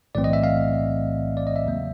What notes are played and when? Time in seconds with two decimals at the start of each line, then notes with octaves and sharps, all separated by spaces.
0.15 B1 A2 E3 A3 C4 D5
0.24 D#5
0.33 E5
0.43 F5
1.37 D5
1.47 D#5
1.56 E5
1.66 E2 C#3 F#3 A#3